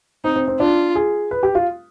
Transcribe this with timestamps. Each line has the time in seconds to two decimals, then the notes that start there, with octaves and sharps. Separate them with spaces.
0.24 C4 D#4
0.36 C4
0.48 C4
0.60 D4 F4
0.95 G#4
1.31 B4
1.43 G4
1.55 F4